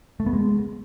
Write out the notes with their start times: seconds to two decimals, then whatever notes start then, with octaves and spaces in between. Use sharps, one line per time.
0.20 A3
0.26 B3
0.33 G#3